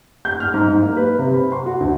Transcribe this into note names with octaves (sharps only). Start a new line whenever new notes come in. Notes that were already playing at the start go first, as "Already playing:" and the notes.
G6
F6
G#2
G#2
A#3
B4
C3
B5
C6
F#4
D2